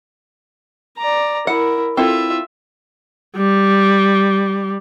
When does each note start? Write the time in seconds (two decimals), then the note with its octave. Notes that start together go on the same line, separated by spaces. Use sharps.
0.98 D5 A#5
1.47 E4 A#4 F#5
1.97 C4 E4 F4 A4 E5
3.36 G3